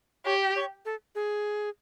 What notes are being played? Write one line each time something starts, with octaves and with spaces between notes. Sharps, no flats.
G4 C#5
C#5
A4
G#4